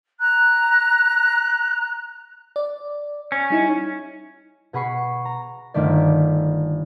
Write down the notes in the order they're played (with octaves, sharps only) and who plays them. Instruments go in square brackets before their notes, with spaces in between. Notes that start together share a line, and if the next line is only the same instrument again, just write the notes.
[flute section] A#5 F#6
[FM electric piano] D5
[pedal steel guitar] C#4
[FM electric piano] G3 D#4 E4
[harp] B2 G#4 F#5 B5 C#6 C7
A#5
G1 D#3 A3 D5